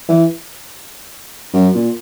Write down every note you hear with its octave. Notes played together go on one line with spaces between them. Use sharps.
E3
F#2
A#2